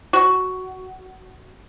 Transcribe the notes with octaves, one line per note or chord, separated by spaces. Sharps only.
F#4